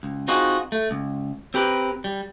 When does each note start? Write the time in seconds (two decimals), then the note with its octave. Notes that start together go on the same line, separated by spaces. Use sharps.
0.03 C#2
0.28 C4 D#4 F4 F#4 G#4
0.72 A3
0.91 C#2
1.54 C4 G4 A#4 B4
2.04 G3